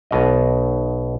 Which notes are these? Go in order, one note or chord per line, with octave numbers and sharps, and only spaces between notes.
B1 B2 D#5